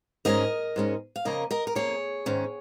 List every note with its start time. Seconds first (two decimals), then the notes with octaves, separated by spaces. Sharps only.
0.25 G#2 G#3 C#4 A#4 D#5
0.76 G#2 G#3 C#4
1.16 F5
1.25 F2 C#3 A#3 C#4 A#4 D#5
1.51 A#4 D#5
1.67 A#4
1.75 F2 C#3 A#3 C#4 G#4 C#5
2.26 G#2 D#3 C#4